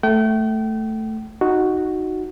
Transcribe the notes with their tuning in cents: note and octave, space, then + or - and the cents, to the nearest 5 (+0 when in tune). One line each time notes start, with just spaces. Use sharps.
A3 +0 G5 -35
D#4 +0 F#4 +0